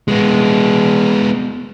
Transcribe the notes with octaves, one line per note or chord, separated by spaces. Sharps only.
G#3 B3